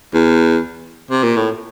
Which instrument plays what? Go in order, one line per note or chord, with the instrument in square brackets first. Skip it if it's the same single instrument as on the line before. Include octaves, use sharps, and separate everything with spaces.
[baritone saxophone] E2
C3
A#2
A2